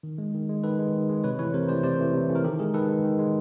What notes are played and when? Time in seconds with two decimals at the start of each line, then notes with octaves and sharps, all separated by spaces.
0.03 D#3
0.18 G#3
0.34 D#3
0.49 G#3
0.63 D#3 A4 B4
0.79 G#3
0.93 D#3
1.09 G#3
1.24 C3 B4 C#5
1.39 E3 B4 C#5
1.42 A3
1.54 C3 A#4 C5
1.68 E3 A3 C5 D5
1.83 C3 C5 D5
1.99 E3 A3
2.14 C3
2.30 E3 A3
2.35 A#4
2.44 D#3 G4 A4
2.59 G#3 G#4 A#4
2.74 D#3 A4 B4
2.89 G#3
3.04 D#3
3.19 G#3